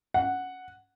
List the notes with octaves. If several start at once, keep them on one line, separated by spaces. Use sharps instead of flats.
F#5